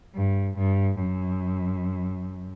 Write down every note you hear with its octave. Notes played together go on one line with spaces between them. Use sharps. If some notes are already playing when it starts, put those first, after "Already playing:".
G2
G2
F#2